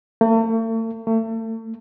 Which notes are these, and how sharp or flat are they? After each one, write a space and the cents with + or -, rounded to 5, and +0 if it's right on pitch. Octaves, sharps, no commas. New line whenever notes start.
A3 +45
A3 +35